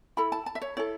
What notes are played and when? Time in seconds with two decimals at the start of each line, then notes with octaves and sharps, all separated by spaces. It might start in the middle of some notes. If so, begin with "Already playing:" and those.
0.17 E4 A4 B5
0.32 A5
0.46 A5
0.55 E5
0.62 C#5
0.77 E4 A4 C#5